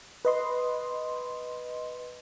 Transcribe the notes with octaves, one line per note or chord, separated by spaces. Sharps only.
B4 D#5 C6